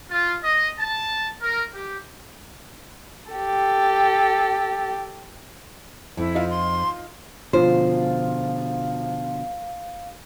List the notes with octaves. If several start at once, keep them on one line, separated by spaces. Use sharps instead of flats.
F4
D#5
A5
A#4
G4
G4 A4
F2 E4
D#4 F4
C6
B2 D3 F3 F4 C5 F5